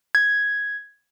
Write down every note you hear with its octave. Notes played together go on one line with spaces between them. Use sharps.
G#6